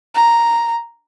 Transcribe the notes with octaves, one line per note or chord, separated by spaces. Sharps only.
A#5